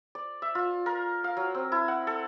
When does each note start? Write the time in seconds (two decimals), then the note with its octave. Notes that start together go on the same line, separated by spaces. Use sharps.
0.15 D5
0.42 E5
0.55 F4
0.86 A#4
1.24 F5
1.37 F#3
1.55 C4
1.72 E4
1.88 F#5
2.07 A4